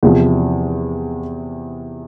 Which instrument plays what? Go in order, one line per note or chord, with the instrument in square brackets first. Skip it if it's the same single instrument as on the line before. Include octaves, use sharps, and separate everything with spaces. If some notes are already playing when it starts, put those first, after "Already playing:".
[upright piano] E2 C3 F3